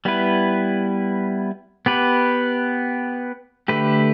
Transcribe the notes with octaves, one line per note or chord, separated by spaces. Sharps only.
G3 B3 E4 B4
B3 G4 B4
D3 A3 G4 B4